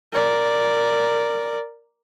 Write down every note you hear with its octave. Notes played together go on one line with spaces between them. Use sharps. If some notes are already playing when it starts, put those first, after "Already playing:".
A#4 D5